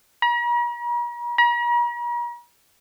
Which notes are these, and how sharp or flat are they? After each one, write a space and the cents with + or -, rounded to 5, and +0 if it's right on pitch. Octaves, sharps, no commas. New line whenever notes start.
A#5 +45
A#5 +45